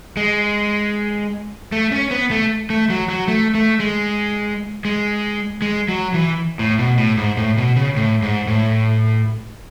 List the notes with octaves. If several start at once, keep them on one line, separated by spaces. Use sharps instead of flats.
G#3
A3
C#4
B3
A3
A3
F#3
F#3
A3
A3
G#3
G#3
G#3
F#3
E3
A2
B2
A2
G#2
A2
B2
C#3
A2
G#2
A2